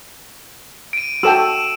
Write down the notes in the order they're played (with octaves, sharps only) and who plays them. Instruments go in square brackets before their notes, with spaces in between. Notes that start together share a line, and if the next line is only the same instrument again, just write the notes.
[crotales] D7 D#7
[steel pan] F#4 A4 G5 [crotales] E6 E7